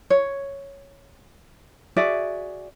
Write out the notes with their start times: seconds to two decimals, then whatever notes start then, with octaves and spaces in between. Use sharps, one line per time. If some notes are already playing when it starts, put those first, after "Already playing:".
0.10 C#5
1.96 F#4 G#4 D5 E5